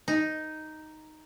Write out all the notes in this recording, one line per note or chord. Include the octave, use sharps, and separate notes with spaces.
D#4